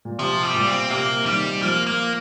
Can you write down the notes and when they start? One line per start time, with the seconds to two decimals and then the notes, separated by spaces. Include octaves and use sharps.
0.05 A#2
0.19 C3 F3
0.43 G3
0.54 A#2
0.67 C4
0.90 C3 A#3
1.26 D#3 G3
1.62 F3 A#3
1.87 A#3